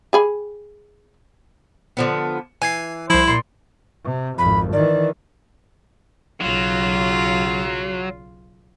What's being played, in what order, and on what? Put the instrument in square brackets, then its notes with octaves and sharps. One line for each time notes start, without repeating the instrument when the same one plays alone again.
[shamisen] G4 G#4 B5
[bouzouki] D3 F3 B3
[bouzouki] E3 [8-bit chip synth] G#5 G#6 C7
[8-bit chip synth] C2 F3 [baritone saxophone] E4 [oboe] C5
[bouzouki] A#2 [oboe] C6
[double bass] C3
[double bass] G#1 F2 [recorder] B5
[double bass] D#3 E3 [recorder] D5
[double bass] B1 C#3 [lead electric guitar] F#3 [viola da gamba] F4